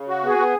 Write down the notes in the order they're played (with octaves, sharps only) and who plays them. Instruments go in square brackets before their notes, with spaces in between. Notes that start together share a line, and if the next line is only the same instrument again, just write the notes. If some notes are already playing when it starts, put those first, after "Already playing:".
Already playing: [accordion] C#3
F#4
[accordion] B3 [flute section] G#4
[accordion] B3